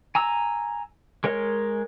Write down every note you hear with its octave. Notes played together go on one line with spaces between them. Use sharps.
G#5 A#5 E6
G#3 A#4 C#5 D#5